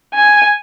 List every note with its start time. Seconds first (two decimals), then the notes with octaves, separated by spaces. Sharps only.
0.15 G#5